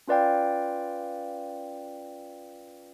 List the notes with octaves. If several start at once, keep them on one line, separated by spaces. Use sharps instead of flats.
C#4 F4 B4 D5 F5 G5